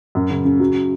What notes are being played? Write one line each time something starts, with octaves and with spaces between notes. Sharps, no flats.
F#2
C#3
C#3
F#3